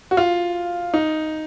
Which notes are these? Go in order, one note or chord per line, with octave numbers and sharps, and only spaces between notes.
F#4
F4
D#4